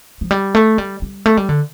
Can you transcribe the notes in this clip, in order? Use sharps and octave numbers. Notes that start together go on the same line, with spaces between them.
F3
G3
A3
G3
G3
A3
G3
D3